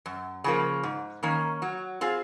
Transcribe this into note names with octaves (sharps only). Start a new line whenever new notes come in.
F#2
C#3 F3 A#3
G#2
D#3 A#3 C#4
F#3
C4 F4 G#4